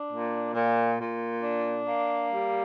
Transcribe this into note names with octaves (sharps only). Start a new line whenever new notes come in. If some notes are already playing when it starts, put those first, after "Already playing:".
Already playing: D4
A#2
A#2
A#2
D4
A#3
G3